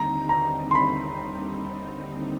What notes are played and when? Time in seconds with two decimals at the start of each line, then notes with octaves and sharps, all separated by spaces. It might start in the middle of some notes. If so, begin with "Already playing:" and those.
Already playing: D#2 D3 G3 C4 D#4 A#5
0.29 A#5
0.71 C6
0.75 B5